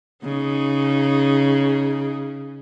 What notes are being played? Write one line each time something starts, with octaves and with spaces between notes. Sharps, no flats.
C#3 D#4